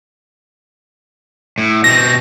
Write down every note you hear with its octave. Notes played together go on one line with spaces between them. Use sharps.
A2
B2 C4 A#6